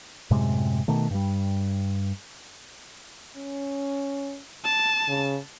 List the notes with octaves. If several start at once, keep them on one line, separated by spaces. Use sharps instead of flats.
F#2 A2 C3 G#3
B2 D#3 A3
G2 G3
C#4
A5
C#3